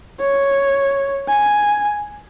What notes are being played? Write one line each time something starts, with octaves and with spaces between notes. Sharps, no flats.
C#5
G#5